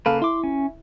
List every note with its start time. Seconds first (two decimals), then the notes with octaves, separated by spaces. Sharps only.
0.06 C#3 A#3 A4 B4 F5
0.22 E4 C6 D6
0.43 C#4